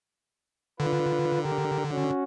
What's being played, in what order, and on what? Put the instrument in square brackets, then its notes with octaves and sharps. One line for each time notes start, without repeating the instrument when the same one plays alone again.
[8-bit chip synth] D3 [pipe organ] F4 B4
[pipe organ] G4 A#4
C#4 F#4